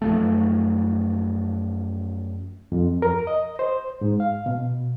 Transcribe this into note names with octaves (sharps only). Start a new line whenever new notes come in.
F#2 F3 A3
F2
A#4
D#5
C5
G#2
F5
B2